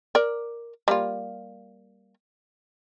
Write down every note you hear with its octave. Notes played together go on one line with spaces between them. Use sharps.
A#4 D5
G3 A#3 F4